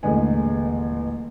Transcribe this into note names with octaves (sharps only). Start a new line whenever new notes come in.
D#1 A1 D3 G#3 B4 G#5